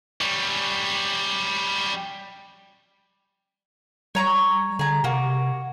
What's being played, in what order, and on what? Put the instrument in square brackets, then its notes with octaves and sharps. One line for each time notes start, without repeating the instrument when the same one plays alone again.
[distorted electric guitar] G3 C#4
[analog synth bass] G3 [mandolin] C#5 A#5 C#6
[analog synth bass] D3 [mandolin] G#4 A#5
[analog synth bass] C3 [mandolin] A#3 F#4